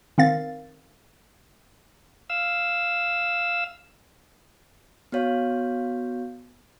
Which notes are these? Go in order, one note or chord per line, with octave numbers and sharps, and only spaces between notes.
D#3 C4 F5 A6
F5 E6
B3 F#4 C#5 F5